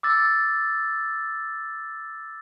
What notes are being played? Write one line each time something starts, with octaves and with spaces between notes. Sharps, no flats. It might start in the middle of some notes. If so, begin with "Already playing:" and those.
D6 E6 A6